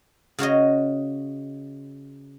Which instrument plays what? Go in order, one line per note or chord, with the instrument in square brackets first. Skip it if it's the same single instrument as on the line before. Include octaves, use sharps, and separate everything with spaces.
[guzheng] C#3 F#4 C#5 D#5